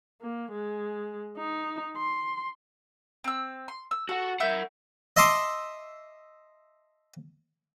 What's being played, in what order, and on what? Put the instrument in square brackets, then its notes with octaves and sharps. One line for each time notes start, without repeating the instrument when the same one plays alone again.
[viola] A#3
G#3
D#4
C6
[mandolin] C4 E6
C6
E6
[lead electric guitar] F#4 F#5 [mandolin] A4
[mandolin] E4 E5 G6 [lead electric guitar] A#4 F#5
[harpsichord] D#5 E5 A5 C6 D6 D#6